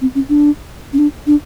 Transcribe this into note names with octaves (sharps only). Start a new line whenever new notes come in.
C4
C#4
D4
C#4
D4
D4